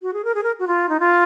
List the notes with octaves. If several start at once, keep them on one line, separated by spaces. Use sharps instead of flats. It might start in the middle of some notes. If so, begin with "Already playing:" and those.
F#4
G#4
A#4
G#4
A#4
F#4
F4
D#4
F4